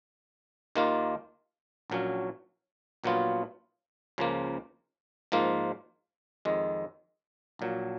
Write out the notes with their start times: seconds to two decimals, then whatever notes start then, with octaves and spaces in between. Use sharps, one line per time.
0.75 D#2 D#3 A#3 F4
1.90 A#1 A#2 F#3 C#4
3.04 A#1 A#2 F#3 B3 F4
4.18 C#2 C#3 F3 A#3
5.32 G#2 F3 A#3 F4
6.45 F2 D#3 G#3
7.59 A#1 A#2 F#3